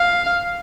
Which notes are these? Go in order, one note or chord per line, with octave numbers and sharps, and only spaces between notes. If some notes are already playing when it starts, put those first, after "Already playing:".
Already playing: F5